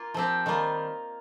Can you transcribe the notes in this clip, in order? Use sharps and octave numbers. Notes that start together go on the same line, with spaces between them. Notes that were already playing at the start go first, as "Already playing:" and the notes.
Already playing: A#3 F4
F3 C4 G4
D#3 G3 A#3 F4